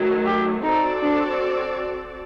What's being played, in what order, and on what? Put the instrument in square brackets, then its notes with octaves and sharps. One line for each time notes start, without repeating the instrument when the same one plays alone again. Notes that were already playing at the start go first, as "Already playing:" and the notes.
Already playing: [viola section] D#3 F#3 A3
[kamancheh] G4
[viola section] C4 F#4 A4 D5 [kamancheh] D#4
[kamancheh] D4